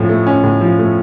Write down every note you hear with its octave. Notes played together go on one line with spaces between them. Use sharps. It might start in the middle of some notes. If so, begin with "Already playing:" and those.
Already playing: A2 F3 C#4
A3
C#4
A2
F3
A3